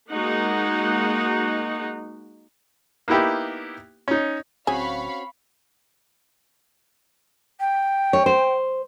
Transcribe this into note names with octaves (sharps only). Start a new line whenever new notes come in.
G#3 A#3 D#4 F#4 F#5
A#3 B3 D#4 E4 G4
C#4 D#4
D1 C4 C#4 F#4 G#4 F5 B5 C#6
G5
C#5
C5